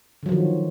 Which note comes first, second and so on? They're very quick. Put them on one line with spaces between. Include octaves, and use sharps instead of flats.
D3 F#3 F3 D#3